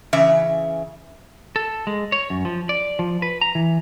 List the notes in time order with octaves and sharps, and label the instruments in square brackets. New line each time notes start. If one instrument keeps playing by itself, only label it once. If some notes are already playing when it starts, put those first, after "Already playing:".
[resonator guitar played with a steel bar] C#3 E3 E5
[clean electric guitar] A4
G#3
C#5
F#2
F3
D5
F3
B4
A#5
E3